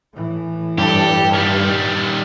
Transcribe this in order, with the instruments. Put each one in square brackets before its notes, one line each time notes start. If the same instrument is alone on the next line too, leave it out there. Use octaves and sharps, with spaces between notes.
[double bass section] A2 E3
[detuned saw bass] G2 [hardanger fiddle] D4 A4 [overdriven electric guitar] G4
[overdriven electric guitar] D#3 G3 [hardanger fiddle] D5